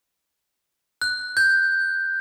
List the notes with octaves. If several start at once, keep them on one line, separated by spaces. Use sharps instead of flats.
F#6
G6